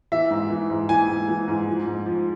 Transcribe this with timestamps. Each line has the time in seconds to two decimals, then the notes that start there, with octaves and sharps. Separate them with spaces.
0.12 E3 E5
0.30 G#2
0.50 E3
0.70 G#2
0.89 E3 G#5
1.08 G#2
1.28 E3
1.48 G#2
1.67 F3
1.86 G#2
2.06 F3